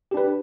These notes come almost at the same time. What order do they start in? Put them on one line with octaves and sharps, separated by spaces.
G4 D4 B4